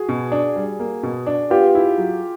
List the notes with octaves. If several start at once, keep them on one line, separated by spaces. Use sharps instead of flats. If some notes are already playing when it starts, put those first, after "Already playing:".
Already playing: F#4 G#4
B2
D4
G3
A#3
B2
D4
B3 F4 G4
E4
F#3